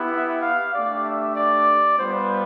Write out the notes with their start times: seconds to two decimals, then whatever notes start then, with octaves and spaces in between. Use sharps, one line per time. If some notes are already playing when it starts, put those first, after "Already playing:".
Already playing: B3 E4 G4
0.11 E5
0.42 F5
0.74 A3 D4 G4 D5
1.05 E5
1.36 D5
1.98 G3 B3 F4 C5